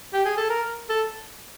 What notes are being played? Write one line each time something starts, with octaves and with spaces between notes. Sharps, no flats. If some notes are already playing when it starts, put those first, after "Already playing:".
G4
G#4
A4
A#4
A4